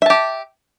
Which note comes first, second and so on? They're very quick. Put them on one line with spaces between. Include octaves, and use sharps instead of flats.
E5 A5 G4